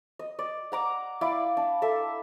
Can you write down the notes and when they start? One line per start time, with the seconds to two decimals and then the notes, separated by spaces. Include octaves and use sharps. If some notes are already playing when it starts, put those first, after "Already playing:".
0.19 D#5
0.39 D5
0.72 F#5 A#5 D6
1.21 E4 D5 F5
1.57 D4
1.82 A4 E5